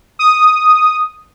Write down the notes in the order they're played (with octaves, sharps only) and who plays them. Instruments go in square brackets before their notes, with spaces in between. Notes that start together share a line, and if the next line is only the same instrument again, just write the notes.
[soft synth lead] D#6